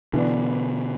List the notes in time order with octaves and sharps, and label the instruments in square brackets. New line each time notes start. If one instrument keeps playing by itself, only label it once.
[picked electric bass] B2 D3 [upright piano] E3 B3 D4